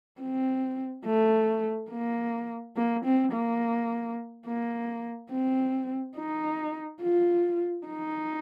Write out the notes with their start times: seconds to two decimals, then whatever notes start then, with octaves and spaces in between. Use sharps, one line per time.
0.21 C4
1.06 A3
1.91 A#3
2.76 A#3
3.05 C4
3.33 A#3
4.46 A#3
5.31 C4
6.17 D#4
7.01 F4
7.87 D#4